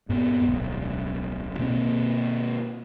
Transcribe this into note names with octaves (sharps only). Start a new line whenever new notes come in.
G2 A#2 B3
D1 B1
B2 A#3 C4